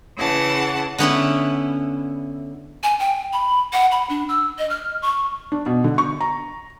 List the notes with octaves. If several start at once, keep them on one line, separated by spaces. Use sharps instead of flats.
C#3 E3 F#5 A5
D3 B3 C#4 E4
G#5
G5
B5
F#5
B5
D4
E6
D#5
F6
C#6
D4
B2
D3
C#6
A#5